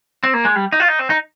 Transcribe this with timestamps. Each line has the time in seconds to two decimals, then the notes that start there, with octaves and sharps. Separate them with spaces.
0.24 C4
0.34 A#3
0.45 G#3
0.56 G3
0.73 D#4
0.80 F4
0.88 D#4
0.99 C4
1.10 D#4